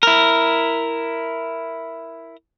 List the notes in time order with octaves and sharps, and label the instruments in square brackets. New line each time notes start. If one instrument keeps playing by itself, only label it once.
[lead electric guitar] E4 A#4